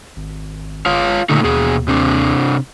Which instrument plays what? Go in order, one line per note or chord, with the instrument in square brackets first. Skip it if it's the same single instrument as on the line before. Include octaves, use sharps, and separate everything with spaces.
[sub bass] G#1
[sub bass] G1 [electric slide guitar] F4 C#5 F5
[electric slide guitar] A#2 A3 D#4 [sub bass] D3
[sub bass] D#2 [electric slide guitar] B2 G#4
[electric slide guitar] C3 C4 D4